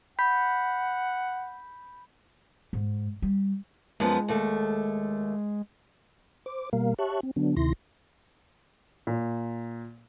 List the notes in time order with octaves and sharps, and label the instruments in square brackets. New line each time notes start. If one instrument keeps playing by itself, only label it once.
[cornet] F#5 [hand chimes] B5 G6 B6
[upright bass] G#2
G3
[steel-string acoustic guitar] F#2 F3 B3 [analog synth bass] G#3
[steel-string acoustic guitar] D#2 A3
[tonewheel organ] C5 D6
B2 G3 A#3 A#4 F5
G4 C#5 E5 A5 C#6 F#6
C4
D3 F#3 B3 D4
D2 C3 D#3 E4 C6 A#6
[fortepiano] A#2